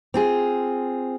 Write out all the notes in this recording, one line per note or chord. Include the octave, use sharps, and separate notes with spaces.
C4 F4 G#4